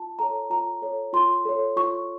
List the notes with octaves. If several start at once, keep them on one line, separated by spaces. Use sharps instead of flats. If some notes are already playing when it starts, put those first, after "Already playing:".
Already playing: F4 A5
A4 C#5 A#5
F4 A#5
A4 C#5
F4 C6
A4 C#5
F4 C#6